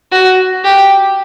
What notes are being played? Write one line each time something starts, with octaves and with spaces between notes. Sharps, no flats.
F#4
G4